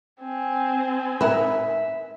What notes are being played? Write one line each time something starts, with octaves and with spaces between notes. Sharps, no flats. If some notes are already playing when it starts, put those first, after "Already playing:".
C4 G#5
D#4 A#4 B4 E5